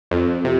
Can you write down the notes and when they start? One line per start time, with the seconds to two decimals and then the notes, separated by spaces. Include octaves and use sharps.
0.11 F2
0.45 C3